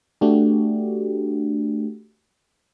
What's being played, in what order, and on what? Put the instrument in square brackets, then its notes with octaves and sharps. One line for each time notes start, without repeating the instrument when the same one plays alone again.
[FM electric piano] A3 D4 F#4 G4